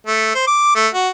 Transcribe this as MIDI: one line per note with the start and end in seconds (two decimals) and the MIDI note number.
0.07 0.35 57
0.35 0.45 72
0.47 0.73 86
0.75 0.88 57
0.94 1.09 66